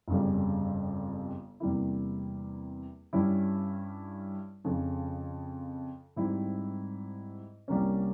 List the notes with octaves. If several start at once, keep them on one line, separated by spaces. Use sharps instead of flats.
G1 F2 C#3 G3
E2 C3 G3 A#3 E4
G2 G3 C#4 E4
F2 C#3 F3
G#2 G3 C4 E4
C2 C3 G3 A#3 C#4